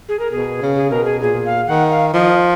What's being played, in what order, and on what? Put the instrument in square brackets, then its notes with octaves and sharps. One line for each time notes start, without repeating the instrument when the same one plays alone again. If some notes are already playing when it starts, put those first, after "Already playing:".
[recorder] G#4
A#4
[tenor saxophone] B2 [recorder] G#4
[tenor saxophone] C#3
[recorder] G#4
[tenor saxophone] B2 [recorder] A#4
[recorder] G#4
[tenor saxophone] A#2 [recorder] G#4
[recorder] F5
[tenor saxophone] D#3 [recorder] F#5
[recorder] F5
[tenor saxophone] F3 [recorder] D#5